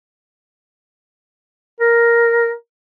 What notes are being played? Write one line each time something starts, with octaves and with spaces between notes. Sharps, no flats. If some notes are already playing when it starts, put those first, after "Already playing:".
A#4